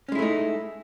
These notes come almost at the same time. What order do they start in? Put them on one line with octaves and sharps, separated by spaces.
C#4 G#3 E4 A3 D#4